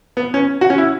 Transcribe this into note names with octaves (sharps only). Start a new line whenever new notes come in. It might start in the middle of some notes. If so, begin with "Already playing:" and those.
B3
C#4
F#4
C#4
E4